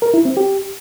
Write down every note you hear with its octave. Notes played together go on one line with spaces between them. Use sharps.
A#4
E4
C4
G4